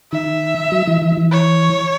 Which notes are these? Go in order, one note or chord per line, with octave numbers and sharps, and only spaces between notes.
D#3 E5
F#3
E3
E3
E3
C#5